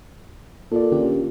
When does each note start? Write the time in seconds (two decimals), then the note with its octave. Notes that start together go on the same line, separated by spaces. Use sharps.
0.72 A#2 A4 D5
0.92 D3 C#4 G4